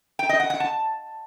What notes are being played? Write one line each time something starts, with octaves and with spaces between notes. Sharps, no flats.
G5
D#5
F#5
F#5
A5